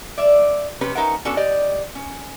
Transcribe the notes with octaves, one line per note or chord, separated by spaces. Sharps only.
D5 E5
C3 C#4 G4 B4
C#4 D#4 A#4 B4 E5 F#5
B3 C#4 D4 F#4 A4
G4 D5 D#5
C#4